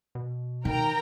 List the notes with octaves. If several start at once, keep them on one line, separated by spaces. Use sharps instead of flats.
B2
D#3 A#4 G5 A#5